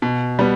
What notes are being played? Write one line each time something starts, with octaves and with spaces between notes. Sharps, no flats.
B2
G3 B3